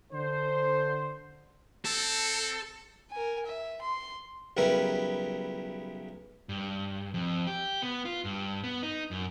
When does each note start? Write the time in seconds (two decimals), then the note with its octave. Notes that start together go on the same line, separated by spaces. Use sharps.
0.13 D3 C5
1.85 C4 A4
3.11 A#4 G#5
3.46 E5
3.81 C6
4.57 B1 C#3 G3 E4 A#4 B4
6.49 G2
7.14 F2
7.47 G4
7.82 B3
8.05 F4
8.25 G2
8.64 B3
8.83 D#4
9.11 F#2